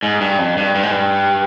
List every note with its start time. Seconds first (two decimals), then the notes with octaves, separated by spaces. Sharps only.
0.03 G#2
0.21 G2
0.39 F2
0.57 G2
0.75 G2
0.83 G#2
0.91 G2